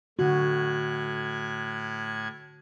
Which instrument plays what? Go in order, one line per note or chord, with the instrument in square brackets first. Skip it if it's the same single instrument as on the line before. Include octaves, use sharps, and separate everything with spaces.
[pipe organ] A2 F#6 G#6 [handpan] D3 F#4